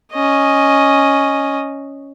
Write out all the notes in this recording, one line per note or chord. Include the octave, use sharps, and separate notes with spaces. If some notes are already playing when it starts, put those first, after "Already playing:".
C#4 D#5